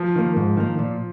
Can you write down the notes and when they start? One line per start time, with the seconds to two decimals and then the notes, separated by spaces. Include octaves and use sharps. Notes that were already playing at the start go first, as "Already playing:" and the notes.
Already playing: F3
0.16 D#3 A#3
0.36 G#2
0.57 D#3 A#3
0.79 A#2